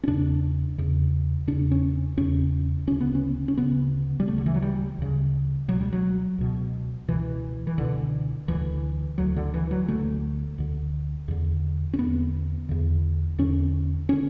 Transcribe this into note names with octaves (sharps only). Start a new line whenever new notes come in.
C#4
E2 C#3 D4
E2 C#3
E2 C#3 D4
C#4
E2 C#3 C#4
D2 C#3 C#4
B3
C#4
C#4
D2 C#3 B3
G3
D2 C#3 A3
D3
E3
F#3
G3
D2 C#3
C#2 B2 F#3
G3
F#3
C#2 B2
C#2 B2 E3
E3
C#2 B2 D3
D2 D3 E3
D2 D3 F#3
D3
E3
F#3
D2 D3 A3
D2 D3
E2 D3
C#4
E2 D3 B3
E2 D3
E2 D3 C#4
D3 C#4